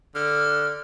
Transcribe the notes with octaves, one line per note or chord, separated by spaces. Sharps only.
D3 F6